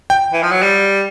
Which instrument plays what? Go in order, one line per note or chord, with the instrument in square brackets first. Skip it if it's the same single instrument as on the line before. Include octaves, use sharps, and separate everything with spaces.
[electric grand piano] G5
[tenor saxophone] E3
F3
F#3
G3